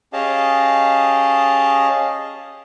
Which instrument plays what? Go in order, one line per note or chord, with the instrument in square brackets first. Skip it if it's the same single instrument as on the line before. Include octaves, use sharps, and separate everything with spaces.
[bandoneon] C#4 G4 G#4 D#5 F5 A5